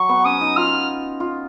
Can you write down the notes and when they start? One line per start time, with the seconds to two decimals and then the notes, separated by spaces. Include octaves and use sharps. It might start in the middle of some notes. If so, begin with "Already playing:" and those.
Already playing: F#3 C#6
0.09 B3
0.25 C#4 D#6
0.41 D#4
0.56 F4 F6
1.20 F4